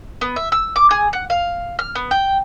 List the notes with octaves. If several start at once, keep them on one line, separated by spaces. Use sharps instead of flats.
B3
E5
E6
D6
G#4
F#5
F5
F6
B3
G5